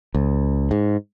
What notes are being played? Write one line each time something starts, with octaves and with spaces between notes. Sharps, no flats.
C#2
G#2